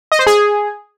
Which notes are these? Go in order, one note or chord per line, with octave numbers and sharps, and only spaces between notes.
D#5
C5
G#4